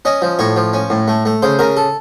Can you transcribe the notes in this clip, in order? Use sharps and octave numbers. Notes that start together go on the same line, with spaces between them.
C#4 D#5
F3
A2 C#5
F3
C#4
A2
A3
A3
C#3 C5
C#3 A#4
A4